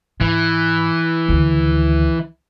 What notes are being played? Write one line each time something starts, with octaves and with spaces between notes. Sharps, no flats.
G#2 E3
D2 D#3